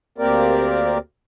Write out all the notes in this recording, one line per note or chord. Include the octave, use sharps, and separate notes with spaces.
D2 A#3 C4 G4 A#4 D5